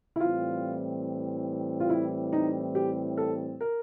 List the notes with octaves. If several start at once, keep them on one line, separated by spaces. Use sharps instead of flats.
E4
A2 E3 G3 C4 F4
F4
E4
D#4
G4
A4
A#4